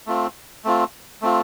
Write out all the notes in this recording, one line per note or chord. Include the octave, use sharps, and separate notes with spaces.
A3 C4 F4
A3 C4 F4
A3 C4 F4